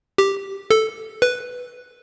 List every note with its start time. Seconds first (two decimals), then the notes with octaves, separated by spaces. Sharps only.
0.18 G4
0.71 A4
1.22 B4